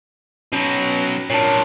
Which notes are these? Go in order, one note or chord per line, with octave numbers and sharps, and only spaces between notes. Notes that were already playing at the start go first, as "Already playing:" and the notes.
B2 F#3 C#4 A#6
A#2 D3 C#5 A5